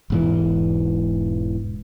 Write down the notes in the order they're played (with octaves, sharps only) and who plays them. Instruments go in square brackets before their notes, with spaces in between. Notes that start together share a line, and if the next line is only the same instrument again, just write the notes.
[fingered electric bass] E1 G#2 E3